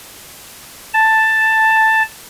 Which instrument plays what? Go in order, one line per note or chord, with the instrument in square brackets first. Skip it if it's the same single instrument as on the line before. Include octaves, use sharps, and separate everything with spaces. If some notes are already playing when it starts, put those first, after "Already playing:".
[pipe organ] A5